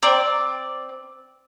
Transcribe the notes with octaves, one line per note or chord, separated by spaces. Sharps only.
C4 C5 D5 G5 A#5